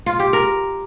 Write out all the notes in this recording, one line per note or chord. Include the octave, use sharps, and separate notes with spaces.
F4
G4
A#4